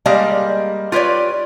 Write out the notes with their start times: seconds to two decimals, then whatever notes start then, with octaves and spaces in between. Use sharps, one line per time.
0.06 G3 G#3 A#3 D5 D#5 F5
0.92 F4 G4 B4 C#5 D5